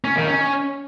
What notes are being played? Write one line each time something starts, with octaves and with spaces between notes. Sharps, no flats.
C#4
D#3
C#4